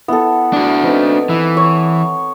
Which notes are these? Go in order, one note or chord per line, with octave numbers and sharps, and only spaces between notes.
B3 E4 A4
D4 F#4
C4 D#4 B4
E3 E6
C#5